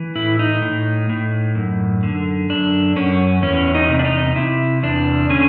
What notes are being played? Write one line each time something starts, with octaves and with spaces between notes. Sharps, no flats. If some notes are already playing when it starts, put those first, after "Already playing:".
Already playing: E3
A2 E4
D#4
A2
A2
F#2
D3
F#2 D4
F#2 C#4
E2 C#4
D#4
C3
D4
D#4
C3 E4
E2 D4
D3 C#4